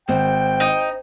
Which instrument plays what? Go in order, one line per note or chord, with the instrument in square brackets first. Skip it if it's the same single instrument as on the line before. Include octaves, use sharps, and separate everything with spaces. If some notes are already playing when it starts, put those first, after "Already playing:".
[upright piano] G#1 [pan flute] C5 [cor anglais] G5
[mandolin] D#4